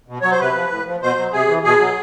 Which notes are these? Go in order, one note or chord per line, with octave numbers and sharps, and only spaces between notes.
B2
F#3 C#5
C5
C3 B4
F3
A2
F3
B2 C5
F#3
C3 G#4
E3
B2 G#4
F#3